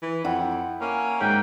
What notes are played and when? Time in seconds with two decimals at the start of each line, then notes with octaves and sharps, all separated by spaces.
0.02 E3
0.24 F2 E4 F#5 G5
0.81 A#3 C#4
1.21 G#2 G5